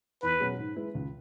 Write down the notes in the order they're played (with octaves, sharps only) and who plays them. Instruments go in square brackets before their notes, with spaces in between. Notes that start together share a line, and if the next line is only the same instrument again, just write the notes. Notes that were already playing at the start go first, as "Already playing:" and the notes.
[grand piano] E2 [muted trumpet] B4
[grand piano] B2 F#3 C#4 G#4
G#2
G#3 E4 B4
C#2